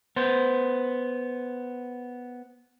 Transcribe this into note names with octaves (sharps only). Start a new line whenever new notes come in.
B3 C5